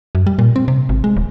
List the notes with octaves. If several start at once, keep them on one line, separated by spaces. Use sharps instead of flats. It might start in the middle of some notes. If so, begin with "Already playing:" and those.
F#2
G3
A#2
C4
C3
G#1
G#3
D1